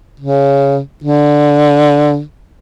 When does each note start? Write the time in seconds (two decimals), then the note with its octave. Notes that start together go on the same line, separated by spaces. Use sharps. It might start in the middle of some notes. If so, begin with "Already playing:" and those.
0.20 C#3
1.04 D3